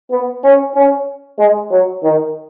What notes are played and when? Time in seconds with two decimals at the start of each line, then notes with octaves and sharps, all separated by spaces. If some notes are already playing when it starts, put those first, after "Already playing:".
0.11 B3
0.44 C#4
0.75 C#4
1.39 G#3
1.71 F#3
2.03 D#3